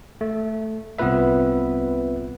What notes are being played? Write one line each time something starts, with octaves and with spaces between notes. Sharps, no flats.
A3
C2 B3 C4 F4 B4 E5